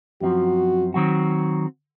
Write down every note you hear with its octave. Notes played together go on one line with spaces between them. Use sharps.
F#2 F3 C4 F#4
D#3 F#3 C4 F#4